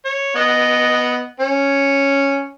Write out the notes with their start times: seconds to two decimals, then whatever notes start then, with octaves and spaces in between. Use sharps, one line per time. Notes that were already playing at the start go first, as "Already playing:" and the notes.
0.05 C#5
0.36 B3 D#5
1.40 C#4